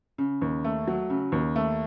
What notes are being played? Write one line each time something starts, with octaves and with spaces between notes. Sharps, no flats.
C#3
D#2
A3
F#3
C#3
D#2
A3